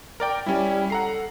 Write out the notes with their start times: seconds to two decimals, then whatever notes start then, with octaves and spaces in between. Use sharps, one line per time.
0.20 A#4 D5 G5
0.46 G3 C#4 E4
0.90 A4 F#5 A#5 C7